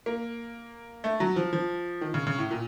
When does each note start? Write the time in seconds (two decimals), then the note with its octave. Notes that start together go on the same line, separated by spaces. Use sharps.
0.06 A#3
1.04 A3
1.20 F#3
1.36 F3
1.53 F3
2.01 D#3
2.14 C#3
2.27 C#3
2.38 A2
2.51 A#2